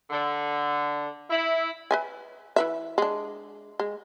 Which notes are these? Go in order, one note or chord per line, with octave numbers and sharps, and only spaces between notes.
D3
E4
B4 E5 G#5
E3 B4 E5
G#3 D4
G#3